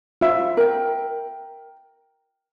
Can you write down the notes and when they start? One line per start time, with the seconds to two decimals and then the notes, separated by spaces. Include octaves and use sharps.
0.21 F4 E5
0.57 A#4 G5